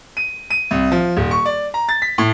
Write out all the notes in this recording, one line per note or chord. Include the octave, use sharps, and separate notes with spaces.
D#7
D#7
C2
F3
D#1
C#6
D5
A#5
A6
B6
A2